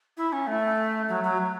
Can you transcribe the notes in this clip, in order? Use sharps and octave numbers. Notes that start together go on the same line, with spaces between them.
E4
C#4
A3
F#3
F#3